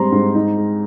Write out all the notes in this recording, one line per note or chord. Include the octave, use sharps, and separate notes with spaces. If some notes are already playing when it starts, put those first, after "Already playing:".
Already playing: G#2 G3 C4 A#5 C6
G#2
D#4
G#3